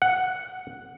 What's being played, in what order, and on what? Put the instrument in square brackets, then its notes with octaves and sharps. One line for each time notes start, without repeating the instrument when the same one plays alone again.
[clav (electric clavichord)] F#5